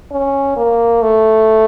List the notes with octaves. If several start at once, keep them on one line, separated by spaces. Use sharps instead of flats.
C#4
A#3
A3